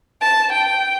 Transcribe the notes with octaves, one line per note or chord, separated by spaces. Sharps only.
A5
G5